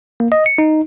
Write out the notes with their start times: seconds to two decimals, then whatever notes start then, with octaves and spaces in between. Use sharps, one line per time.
0.20 A#3
0.32 D#5
0.46 C#7
0.58 D#4